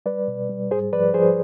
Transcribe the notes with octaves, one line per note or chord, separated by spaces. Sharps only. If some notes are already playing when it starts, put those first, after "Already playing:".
G3 B4 D5
B2
G3
G#2 G#4 C5
F3 B4 D5
F3 G#4 C5